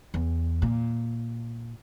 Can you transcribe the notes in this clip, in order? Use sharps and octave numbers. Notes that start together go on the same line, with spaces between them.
E2
A#2